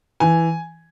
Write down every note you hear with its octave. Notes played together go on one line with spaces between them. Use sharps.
E3 G#5